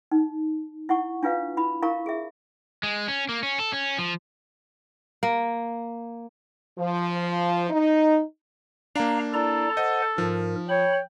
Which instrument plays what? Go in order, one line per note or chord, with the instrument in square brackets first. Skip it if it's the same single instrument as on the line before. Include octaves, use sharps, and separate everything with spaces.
[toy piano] D#4
E4 F#5 C#6
D4 F4 B4 F5
E4 B5
E4 A#4 F5 A#5 C#6
G#4 E5
[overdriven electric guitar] G#3
C#4
A#3
C#4
A4
C#4
F3
[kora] A#3
[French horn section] F3
D#4
[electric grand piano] A#3 D4 [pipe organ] F5 A#5
[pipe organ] E4 D5 A#5 [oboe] A4
[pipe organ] C5 F#5 [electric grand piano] D#5
[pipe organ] G#2 A#4 [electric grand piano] F3
[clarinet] C#5 [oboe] G5 [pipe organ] B5